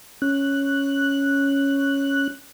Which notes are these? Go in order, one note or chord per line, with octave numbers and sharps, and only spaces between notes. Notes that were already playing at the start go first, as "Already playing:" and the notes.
C#4 F#6